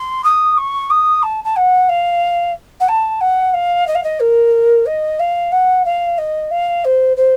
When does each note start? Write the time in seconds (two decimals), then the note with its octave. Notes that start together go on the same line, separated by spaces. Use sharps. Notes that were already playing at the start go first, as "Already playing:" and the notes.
Already playing: C6
0.24 D#6
0.57 C#6
0.90 D#6
1.22 A5
1.44 A5
1.56 F#5
1.89 F5
2.80 F#5
2.88 A5
3.21 F#5
3.54 F5
3.87 D#5
3.95 F5
4.03 D#5
4.20 A#4
4.86 D#5
5.19 F5
5.52 F#5
5.85 F5
6.18 D#5
6.51 F5
6.84 C5
7.17 C5